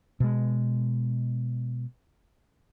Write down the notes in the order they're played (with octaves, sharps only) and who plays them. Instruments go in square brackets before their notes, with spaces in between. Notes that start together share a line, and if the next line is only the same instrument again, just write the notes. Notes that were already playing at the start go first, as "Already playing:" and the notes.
[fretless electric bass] B2 G#3